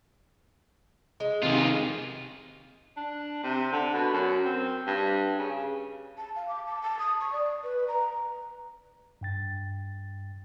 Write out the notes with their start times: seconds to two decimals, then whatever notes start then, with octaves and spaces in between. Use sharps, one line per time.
1.20 G#3
1.43 C3 D#3 F4 G#4
2.97 D4
3.43 C3
3.72 D3
3.94 B2
4.13 F#2
4.45 C4
4.87 G2
5.38 C#3
6.18 A5
6.36 F5
6.48 D6
6.67 A5
6.82 A5
6.99 D#6
7.21 C#6
7.32 D5
7.64 B4
7.88 A#5
9.21 G2 G5 A6